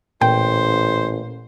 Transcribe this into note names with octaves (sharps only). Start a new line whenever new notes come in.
A1 A#2 C5 G5